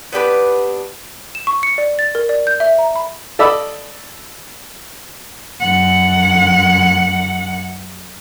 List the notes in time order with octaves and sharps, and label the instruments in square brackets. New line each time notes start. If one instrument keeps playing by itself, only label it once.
[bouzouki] B3 D4 G4 B4
[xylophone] E7
C#6
C#7
D5
A6
A#4
D5
G6
E5
A#5
B5
[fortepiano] A4 D5 D#5 B5 E6
[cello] F#2 F#5